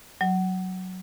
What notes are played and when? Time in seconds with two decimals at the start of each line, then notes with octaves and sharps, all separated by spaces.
0.21 F#3